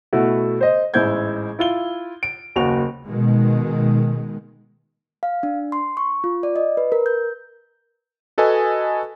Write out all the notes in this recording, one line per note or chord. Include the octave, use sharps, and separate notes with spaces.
B2 A3 E4 F#4
C5 D#5
A1 G#2 E4 C5 G6 G#6
E4 F4 G7
D7
F#1 D#2 F#4 F7
B2 D#3 G#3
F5
D4
C6
C#6
F4
D5
D#5
B4
A#4
G6
F#4 A4 B4 D#5 G#5